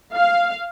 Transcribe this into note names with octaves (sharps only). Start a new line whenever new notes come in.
F5